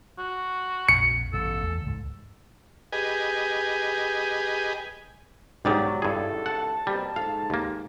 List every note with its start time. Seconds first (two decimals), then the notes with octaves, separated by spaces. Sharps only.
0.18 F#4
0.89 A#1 F2 C#7
1.33 A1 G2 B2 A4
1.63 E2 A3
1.84 C#2 G#2
2.92 G4 G#4 B4 D#5 G#5
5.65 B1 G#2 D#3 F#3 F#4 G4 D5
6.02 G#1 C#2 G2 E4 G#4 A4
6.46 F#5 A5
6.87 B2 G3 A#3 C4
7.16 G#2 A4 F5
7.50 D#2 A#3